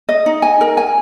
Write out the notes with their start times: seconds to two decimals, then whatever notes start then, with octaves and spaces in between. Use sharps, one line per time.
0.09 D#5
0.26 D#4
0.42 G#5
0.61 A#4
0.77 G#5